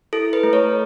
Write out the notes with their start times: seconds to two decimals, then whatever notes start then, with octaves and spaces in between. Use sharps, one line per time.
0.13 E4 A4
0.33 B4
0.43 A3
0.53 C#5